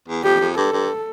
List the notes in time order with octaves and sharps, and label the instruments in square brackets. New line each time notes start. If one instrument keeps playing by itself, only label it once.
[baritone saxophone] E2
[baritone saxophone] F2 [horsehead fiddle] G4
[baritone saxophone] F2
[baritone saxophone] G2 [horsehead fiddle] A4
[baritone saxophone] G2